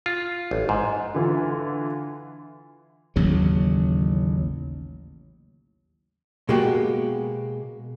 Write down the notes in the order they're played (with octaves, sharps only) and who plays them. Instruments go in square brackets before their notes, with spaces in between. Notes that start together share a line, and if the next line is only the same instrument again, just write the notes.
[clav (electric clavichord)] F4
A1
G#2
[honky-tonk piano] D3 E3 F4
[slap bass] A1 D#2 C#3 F#3
[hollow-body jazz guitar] B2 G#3 A#3 F#4 G4